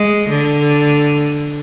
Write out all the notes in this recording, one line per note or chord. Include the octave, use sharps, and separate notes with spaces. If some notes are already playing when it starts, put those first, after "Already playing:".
Already playing: G#3
D3